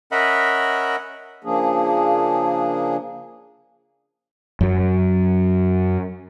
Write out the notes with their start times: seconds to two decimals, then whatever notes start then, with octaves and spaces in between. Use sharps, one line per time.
0.12 C#4 A#4 D#5 E5 F#5 B5
1.44 C#3 F3 A#3 D4 G#4
4.61 F#2 F#3